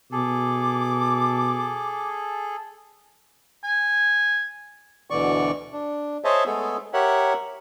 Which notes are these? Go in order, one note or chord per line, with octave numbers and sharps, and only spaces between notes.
B2 G#4 A4 D6
G#5
D2 B2 D3 E3 D5 C#6
D4
G#4 C5 C#5 D#5 E5 A5
G#3 A3 B3 G#4 A4
G4 A#4 C#5 E5 F#5